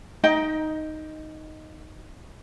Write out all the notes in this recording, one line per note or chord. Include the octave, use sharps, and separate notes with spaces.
D#4 D#5 G5